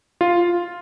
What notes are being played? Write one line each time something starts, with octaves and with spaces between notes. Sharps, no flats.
F4